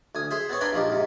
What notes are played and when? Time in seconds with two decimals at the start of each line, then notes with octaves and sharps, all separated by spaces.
0.15 D2 G#5 D#6
0.31 G#4 C5 E5
0.49 B3 C4 C#5
0.61 D4 A#4 B4 F5 G#5 C6
0.73 A#1 F3 D#4 G4
0.90 G#2 C3